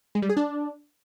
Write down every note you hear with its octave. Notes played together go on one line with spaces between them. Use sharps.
G#3
G3
G#4
D4